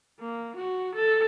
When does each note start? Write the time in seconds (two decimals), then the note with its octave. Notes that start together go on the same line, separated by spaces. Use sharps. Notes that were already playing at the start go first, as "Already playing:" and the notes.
0.20 A#3
0.56 F#4
0.95 A4